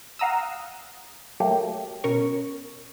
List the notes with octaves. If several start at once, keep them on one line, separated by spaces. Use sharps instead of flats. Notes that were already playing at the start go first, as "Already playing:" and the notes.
F5 F#5 A#5 D#6 E6
F#3 A3 A#3 G4
B2 C#4 A#4 C#6